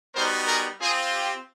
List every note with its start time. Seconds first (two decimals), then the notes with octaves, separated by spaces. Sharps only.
0.14 G3 B3 D#4 F#4 A#4 C5
0.47 G#4 A#4
0.80 C4 F4 G#4
1.12 G4